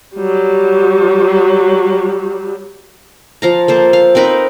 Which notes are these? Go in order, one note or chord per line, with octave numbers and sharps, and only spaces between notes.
F#3 G3
F3 F5 A#5
A#3 A4 C5
F5
C4 D#4 A#4 B4